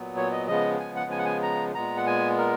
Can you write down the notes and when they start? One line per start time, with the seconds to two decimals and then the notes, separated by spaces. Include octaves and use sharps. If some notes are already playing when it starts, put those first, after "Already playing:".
Already playing: A#2 F#3 B3
0.17 C#5
0.32 D#5
0.48 C#3 F3 G#3 B3 D#5
0.80 G#5
0.96 F#5
1.11 G#5
1.18 F#5
1.25 G#5
1.42 A#5
1.75 A#2 G#3 B3 A#5
1.97 F#5
2.06 G#5
2.38 A#4